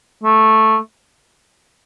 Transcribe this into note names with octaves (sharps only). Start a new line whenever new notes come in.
A3